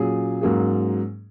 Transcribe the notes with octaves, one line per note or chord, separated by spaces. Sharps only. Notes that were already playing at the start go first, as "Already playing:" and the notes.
Already playing: A#2 F#3 C#4 G#4
G#2 F#3 A#3 C#4 G#4